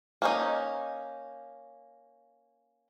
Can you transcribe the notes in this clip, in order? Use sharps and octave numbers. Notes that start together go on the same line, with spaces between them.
A#3 C#4 D#4